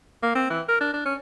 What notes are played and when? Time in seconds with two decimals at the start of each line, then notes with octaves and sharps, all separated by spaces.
0.23 A#3
0.35 C4
0.50 E3
0.69 A#4
0.81 D4
0.93 D4
1.05 C#4